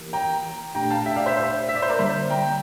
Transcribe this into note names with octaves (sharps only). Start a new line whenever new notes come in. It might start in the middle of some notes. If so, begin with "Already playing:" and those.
Already playing: E3 A#3 E4 G4 A#4
G5 A#5
A#2 A3 D4 G4 G5 A#5
F5 A5
E5 G5
D5 F5
C5 E5
C5 E5
E5
D5
C5
A#4 D5
D3 G3 A#3 C5 E5
G5 A#5